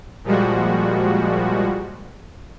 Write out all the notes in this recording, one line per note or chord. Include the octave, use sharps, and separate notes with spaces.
A#2 F3 G3 G#3 F#4